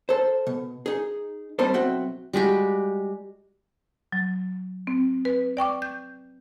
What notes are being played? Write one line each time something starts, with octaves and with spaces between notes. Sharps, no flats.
A4 C5
B2
D#4 G#4
G3 A#3 C4 D#4 A4 C5
B1 C4 F#4 E5 F#5 G5
G3 G#3 F#4 G4
F#3
C4
B4
D5 G5 C#6 D6
G6